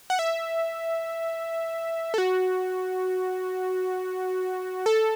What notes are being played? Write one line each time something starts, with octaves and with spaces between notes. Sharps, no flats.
F#5
E5
A4
F#4
A4